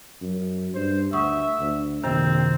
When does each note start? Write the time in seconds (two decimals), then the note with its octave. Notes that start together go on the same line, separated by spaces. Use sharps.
0.22 F#2
0.75 G2 C5
1.13 D2 E5 F#5 C#6 D#6
1.60 D2
2.04 A#1 F#2 C3 D#3 C4